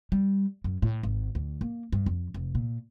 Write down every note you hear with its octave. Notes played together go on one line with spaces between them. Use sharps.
G3
F#2
A2
G#1
D2
A#3
G2
F2
F1
A#2